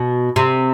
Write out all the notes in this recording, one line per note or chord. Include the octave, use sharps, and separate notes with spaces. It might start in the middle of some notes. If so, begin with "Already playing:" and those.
Already playing: B2
C3